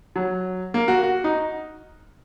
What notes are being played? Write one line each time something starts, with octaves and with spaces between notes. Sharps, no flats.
F#3
A#3
F#4
F#4
D#4